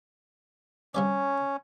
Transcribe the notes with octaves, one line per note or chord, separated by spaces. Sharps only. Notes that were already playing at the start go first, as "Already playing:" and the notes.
C3 G3 C#4 D5